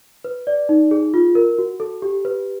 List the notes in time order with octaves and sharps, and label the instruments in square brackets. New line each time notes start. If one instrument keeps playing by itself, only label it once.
[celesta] B4
D5
D#4
G#4
F4
A#4
F#4
A4
G4
B4